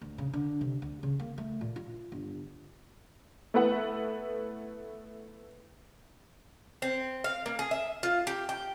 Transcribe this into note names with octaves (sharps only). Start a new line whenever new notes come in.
D2
C#3
D3
C3
D2
C#3
A#3
A3
A#2
F4
G1
A3 B3 E4 B4 E5 F#5
C4
F5
A#3
G#4
E5
F4
G4
G5